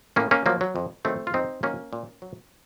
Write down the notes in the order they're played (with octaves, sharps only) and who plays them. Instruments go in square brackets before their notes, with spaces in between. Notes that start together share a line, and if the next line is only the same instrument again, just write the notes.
[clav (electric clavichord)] A2 A#3 C#4
A#3 C#4
F3 F#3 A#3
F#3
F2
D#3 F#3 A3 C4
F4
F2 C4 D#4
D#3 F#3 A#3 C#4
A#2
F#3